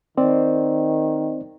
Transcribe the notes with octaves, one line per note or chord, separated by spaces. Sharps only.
D#3 C4 C5 D5